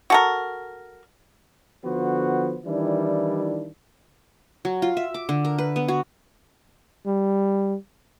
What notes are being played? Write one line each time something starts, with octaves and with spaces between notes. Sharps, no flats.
F#4 A4 A#4
D3 F3 B3 F#4 C5
D#3 E3 G3 D4 E4
F#3
F4
E5
D6
D3
A#4
B4
B3
F#4
G3